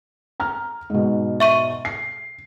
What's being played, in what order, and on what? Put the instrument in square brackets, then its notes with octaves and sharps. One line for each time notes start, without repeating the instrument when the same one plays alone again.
[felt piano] A#5 F6
G#2 B2
[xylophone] E5 C#6 D#7
[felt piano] C7